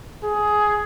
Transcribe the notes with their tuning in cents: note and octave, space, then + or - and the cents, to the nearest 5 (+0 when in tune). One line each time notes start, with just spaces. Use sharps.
G#4 +10